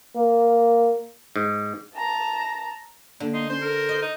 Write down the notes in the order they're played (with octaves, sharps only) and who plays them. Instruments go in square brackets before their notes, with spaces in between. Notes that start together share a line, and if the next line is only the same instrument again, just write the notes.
[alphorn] A#3
[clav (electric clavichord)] G#2
[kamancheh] A5 A#5
[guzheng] D3 [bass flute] A#3
[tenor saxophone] D#4 [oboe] C6
[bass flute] C#4 [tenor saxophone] C5
[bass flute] A4 [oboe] A#4
[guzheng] D#5
[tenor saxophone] D#4